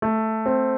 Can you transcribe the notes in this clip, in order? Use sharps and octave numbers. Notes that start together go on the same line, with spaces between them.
A3
C4